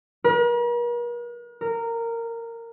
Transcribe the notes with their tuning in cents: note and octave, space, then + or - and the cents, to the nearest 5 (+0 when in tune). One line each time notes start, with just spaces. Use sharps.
A#4 +45
A#4 -15